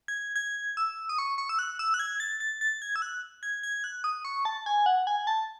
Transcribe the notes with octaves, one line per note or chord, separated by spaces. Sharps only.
G#6
G#6
E6
D#6
C#6
C#6
E6
F#6
E6
F#6
G#6
A6
A6
A6
G#6
E6
F#6
G#6
G#6
F#6
D#6
C#6
A5
G#5
F#5
G#5
A5